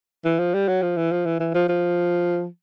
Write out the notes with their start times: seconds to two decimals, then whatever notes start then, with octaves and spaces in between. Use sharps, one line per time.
0.25 E3
0.39 F3
0.54 G3
0.68 F#3
0.82 F3
0.97 E3
1.12 F3
1.26 E3
1.40 E3
1.55 F3
1.69 F3